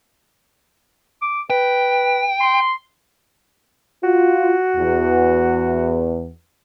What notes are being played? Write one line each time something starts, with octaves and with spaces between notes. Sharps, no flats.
D6
B4 G5
C6
F4 F#4
E2